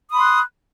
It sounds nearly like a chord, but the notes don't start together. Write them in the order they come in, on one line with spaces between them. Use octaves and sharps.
D#6 B5 C6 F#6